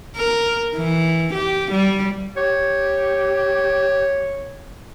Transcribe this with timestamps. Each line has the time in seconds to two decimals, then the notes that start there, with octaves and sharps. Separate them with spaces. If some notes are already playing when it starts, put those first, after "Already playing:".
0.16 A#4
0.76 E3
1.33 G4
1.72 G3
2.36 G4 C#5